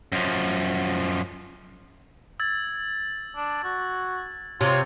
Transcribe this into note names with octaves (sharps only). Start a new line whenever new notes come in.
F#2 F3
E6 G#6 A6
D4
F#4
C3 F4 C#5